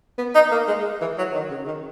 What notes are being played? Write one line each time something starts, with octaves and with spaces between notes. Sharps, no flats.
B3
D#4
A#3
G#3
E3
F#3
D#3
C#3
D#3